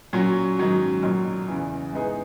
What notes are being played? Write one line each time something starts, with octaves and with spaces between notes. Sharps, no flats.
A#2 F#3 C#4 F#4
G#2 D#3 F#3 C#4 F#4
B1 A#2 F#3
E2 C#3 E3
G#2 E3 B3 D#4 G#4